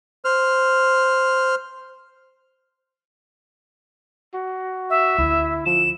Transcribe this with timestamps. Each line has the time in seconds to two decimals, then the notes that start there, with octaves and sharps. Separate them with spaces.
0.25 C5 F6
4.34 F#4
4.90 E5
5.18 D2 E4
5.66 F3 E7